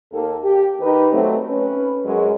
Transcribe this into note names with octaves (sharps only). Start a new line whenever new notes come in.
D#2 A#3 A4
G4
D#3 D#4 G4 B4
F#3 A3 C4
C#4 B4
F#2 F#3 G#3